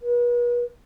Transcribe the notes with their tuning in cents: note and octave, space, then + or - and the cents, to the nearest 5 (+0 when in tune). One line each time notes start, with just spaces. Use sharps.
B4 -40